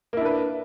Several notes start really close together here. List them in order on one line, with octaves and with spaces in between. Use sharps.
A#3 E4 D4 B4